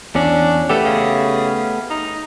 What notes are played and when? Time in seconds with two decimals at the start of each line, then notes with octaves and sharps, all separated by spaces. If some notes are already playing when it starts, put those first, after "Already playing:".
0.15 E2 C#4 D4
0.69 A3 B3 G4 A4
0.84 C#3
1.91 D#4